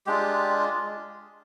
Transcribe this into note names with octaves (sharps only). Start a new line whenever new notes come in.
G#3 D4 F4 G4